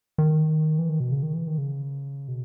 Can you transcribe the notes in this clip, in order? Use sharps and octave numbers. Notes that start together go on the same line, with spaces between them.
D#3
E3
D#3
B2
C#3
D#3
E3
D#3
C#3
B2